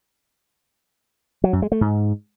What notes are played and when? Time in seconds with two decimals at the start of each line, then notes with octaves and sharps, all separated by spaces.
1.44 F#3
1.53 F#2
1.62 G#3
1.72 A3
1.81 G#2